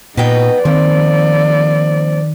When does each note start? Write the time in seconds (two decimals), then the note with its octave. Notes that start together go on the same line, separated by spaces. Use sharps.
0.17 A#2 B3 D#4 D#5 G5
0.65 D#3 F3 A#3 C4 D5